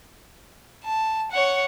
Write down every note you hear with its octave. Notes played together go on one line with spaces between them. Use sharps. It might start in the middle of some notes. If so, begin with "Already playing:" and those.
A5
C#5 F#5